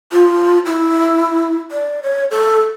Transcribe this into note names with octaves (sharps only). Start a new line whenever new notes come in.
F4
E4
D5
C#5
A4